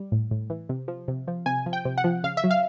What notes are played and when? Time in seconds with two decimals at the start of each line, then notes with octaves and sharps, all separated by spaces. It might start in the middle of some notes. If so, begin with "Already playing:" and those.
Already playing: G3
0.12 A2
0.31 A2
0.50 E3
0.69 C3
0.88 F3
1.08 C3
1.28 F3
1.46 C3 G#5
1.66 F3
1.73 G5
1.85 C3
1.98 F#5
2.04 F3
2.24 C#3 F5
2.37 E5
2.44 F#3
2.51 F5